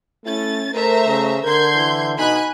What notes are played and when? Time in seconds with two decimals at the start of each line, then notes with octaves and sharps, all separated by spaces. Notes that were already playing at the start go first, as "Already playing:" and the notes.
0.26 A3 C#4 E4 A6
0.74 A3 A#4 C5 E5 A#5
1.07 C#3
1.43 D3 A#4 C6 G6 G#6
1.75 E3
2.18 B2 D#4 G#5 B5 F#6